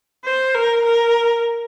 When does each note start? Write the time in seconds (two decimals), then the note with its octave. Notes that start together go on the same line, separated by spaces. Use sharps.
0.25 C5
0.54 A#4
0.85 A#4